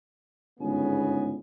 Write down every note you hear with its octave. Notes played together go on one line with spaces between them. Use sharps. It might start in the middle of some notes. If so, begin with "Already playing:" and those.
G1 G#2 C#3 B3 C#4 G#5